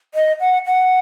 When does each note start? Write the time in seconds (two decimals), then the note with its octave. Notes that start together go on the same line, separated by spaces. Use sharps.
0.14 D#5
0.40 F#5
0.66 F#5